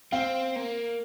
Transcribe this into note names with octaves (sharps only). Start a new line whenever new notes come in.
C4 F5
A#3